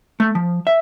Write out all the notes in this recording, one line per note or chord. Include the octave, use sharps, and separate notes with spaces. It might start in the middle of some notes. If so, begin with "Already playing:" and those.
A3
F3
E5